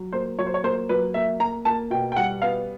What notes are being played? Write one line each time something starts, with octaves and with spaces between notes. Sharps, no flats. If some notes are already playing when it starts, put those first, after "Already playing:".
Already playing: F#3
A#3 C5
F#3 C#5
C5
C#5
A#3 C5
F#3 B4
A#3 E5
A#3 A#5
A#3 A5
B2 G5
G5
G3 F#5
B3 F5